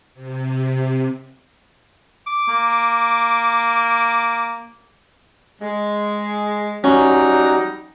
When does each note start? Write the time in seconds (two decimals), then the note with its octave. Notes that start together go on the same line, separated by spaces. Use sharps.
0.14 C3
2.27 D6
2.48 A#3
5.62 G#3
6.84 F#3 G3 C#4 D#4